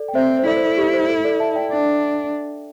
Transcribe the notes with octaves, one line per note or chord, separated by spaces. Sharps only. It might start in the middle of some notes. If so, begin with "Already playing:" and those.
Already playing: A4 D5
G5
C4 C5 E5
C5
E4 A4 D5
C5
A4
G4
C5
A4
A4 D5
E5 A5
D5 G5
D4